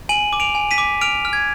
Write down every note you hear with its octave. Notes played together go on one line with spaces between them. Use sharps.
G#5 D#7 F#7
D6
D7 F7
G#5
B6 D#7
D6
F6 D7 F7
F6
G#6